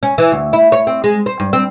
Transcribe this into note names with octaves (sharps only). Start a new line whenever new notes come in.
C#4
E3
D2
E4
C#5
C4
G#3
C5
G2
C4